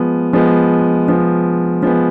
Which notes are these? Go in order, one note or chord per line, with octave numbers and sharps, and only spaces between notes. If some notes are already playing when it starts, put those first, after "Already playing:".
Already playing: F3 G#3 B3
F3 G#3 B3
F3 G#3 B3
F3 G#3 B3